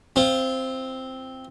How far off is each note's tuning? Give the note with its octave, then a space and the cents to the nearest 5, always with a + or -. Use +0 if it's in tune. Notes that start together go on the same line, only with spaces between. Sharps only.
C4 +0 F4 -25